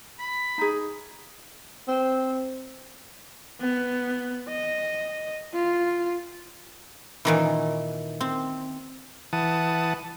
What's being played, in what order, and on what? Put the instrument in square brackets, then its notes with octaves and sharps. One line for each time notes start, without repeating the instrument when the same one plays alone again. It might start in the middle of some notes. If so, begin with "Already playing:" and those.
[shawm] B5
[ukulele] D#4 G#4
[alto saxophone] C4
[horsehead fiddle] B3
D#5
F4
[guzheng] A#2 D#3 E3
C4
[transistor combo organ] E3 F#5 A5 D#6